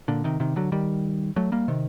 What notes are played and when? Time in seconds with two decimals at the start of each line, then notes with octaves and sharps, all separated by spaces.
0.08 A#2 D3
0.24 C3 D#3
0.40 C3 D#3
0.56 D3 F#3
0.72 D#3 G3
1.36 F#3 A3
1.52 G3 A#3
1.68 C3 D#3